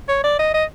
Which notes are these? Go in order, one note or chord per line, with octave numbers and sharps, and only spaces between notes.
C#5
D5
D#5
D#5